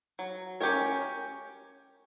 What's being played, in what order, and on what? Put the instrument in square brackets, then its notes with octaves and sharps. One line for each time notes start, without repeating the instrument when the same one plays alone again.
[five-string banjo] F#3
C#4 G4 A#4 C#5